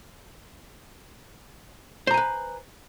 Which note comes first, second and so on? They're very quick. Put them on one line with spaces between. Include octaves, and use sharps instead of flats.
C5 A#5 G#5 B4